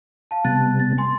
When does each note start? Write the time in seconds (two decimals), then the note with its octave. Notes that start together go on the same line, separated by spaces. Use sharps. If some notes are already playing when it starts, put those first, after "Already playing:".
0.31 F5 A5
0.45 C3 G3 B3 A5 F#6 A6
0.79 A6
0.98 G#5 C6